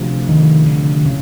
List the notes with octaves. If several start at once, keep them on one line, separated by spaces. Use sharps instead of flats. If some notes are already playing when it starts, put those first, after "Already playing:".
Already playing: D2 C3 F3 A3
D#3
D3
A2 C#3